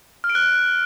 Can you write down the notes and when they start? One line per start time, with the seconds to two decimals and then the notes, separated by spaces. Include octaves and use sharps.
0.24 F6
0.30 D7
0.35 F#6